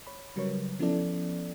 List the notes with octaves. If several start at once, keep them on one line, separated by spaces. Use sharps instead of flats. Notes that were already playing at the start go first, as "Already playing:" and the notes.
C#5 B5
C#3 F#3 G3 A#4 B4 C#5
F3 B3 C#4 E4 A4 D5